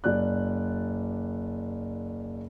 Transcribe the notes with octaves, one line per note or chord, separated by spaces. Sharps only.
F#1 D5 F#6